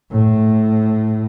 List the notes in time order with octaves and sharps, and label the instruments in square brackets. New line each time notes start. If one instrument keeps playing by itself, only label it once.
[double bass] A2